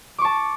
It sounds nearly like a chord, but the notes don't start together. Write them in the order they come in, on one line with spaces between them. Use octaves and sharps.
D6 C#6 A5